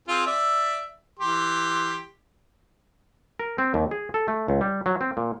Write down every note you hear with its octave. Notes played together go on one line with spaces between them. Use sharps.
C4 F4 G#4
D5 E5
E3 G4 C6
A#4
C4
D#2
G#4
A4
A3
C#2
G3
F#3
C4
A#2